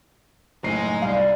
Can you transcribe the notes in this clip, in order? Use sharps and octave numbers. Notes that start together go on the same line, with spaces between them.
F#1 A2 G#3 D#4 C7
C2 G3 F5